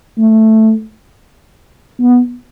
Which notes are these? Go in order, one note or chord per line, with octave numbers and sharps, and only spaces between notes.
A3
B3